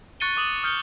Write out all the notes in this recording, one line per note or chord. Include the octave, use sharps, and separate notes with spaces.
C#6 F#6 A6 C#7 D#7 G7
D6 D#6 F#7
D#6 F6 G6 C#7 G7